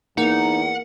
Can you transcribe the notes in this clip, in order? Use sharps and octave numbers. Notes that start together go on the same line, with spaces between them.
E2 A#3 D#4 F#5